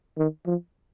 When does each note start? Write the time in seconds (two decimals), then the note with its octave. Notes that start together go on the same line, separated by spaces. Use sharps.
0.17 D#3
0.46 F3